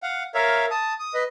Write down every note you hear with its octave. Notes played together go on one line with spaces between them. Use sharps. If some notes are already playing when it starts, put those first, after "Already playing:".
F5 F#5
A#4 C#5 E5 F5
A5 D#6
D#6
B4 D#5